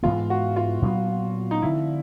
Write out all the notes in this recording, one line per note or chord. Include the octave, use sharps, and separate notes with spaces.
G#2 E3 G#3 B3 F4
F#4
F4
A#2 F#3 B3 D4
D#4
D3 F3 A3 C4 E4